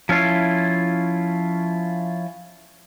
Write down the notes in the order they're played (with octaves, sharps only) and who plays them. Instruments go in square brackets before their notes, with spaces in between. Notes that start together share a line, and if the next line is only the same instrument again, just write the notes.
[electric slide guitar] F3 C#4 E4 F4